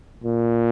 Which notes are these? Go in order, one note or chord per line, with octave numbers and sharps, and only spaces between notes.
A#2